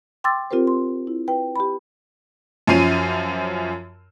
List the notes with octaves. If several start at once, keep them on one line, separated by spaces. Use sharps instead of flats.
G5 C6 D6 E6 A6
C4 F4 G4 A#4 C5
C6
E4
B4 G5
G4 B5
F#2 F3 C#4 C7 D#7